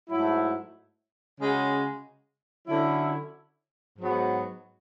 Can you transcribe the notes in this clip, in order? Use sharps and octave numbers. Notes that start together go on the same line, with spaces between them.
G#2 F#3 A3 E4
C#3 G#3 C#4 F#4
D3 F#3 C#4 E4
G#2 F#3 B3